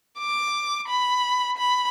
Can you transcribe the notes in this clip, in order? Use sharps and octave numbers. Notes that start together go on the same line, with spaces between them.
D6
B5
B5